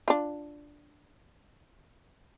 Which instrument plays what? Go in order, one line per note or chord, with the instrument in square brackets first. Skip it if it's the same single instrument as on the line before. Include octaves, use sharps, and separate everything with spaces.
[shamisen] D4 F4